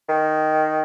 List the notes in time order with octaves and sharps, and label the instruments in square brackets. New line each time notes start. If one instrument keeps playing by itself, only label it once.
[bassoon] D#3